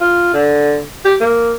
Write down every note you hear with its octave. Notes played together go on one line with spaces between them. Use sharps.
F4
D3
G4
A#3